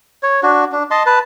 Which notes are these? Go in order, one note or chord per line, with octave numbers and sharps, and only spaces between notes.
C#5
D4 F#4
D4
D#5 A5 C6
B4 A5